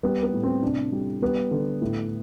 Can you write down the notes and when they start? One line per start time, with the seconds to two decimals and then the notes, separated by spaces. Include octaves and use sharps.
0.03 G3 B3
0.23 B3
0.33 A2
0.43 C4
0.62 C3 D4
0.92 G3
1.22 G3 B3
1.51 D3
1.82 A2